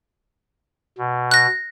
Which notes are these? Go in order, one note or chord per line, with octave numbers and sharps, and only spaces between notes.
B2
F#6 A#6